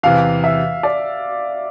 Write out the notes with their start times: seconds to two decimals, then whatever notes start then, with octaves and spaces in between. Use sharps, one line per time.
0.03 E2 C3 E3 F5
0.44 E5
0.83 D5